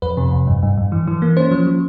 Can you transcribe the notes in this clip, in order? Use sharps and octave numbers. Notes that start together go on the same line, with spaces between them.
F2 B4
C3
F2
G2
G2
G2
E3
E3
A#3
C#4 C5
F3
F3